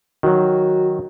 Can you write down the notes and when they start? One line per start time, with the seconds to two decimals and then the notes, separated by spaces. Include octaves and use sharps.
0.23 D#3 F#3 F#4